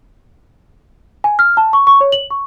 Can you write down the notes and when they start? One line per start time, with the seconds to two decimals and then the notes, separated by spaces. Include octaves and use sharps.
1.24 G#5
1.39 F6
1.57 A5
1.73 C#6
1.87 C#6
2.01 C#5
2.12 F#7
2.30 C#6